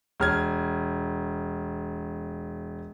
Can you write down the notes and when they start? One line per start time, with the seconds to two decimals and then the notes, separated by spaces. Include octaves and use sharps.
0.20 E1 F6 G#6